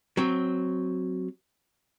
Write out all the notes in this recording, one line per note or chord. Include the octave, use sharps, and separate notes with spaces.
F#3 C4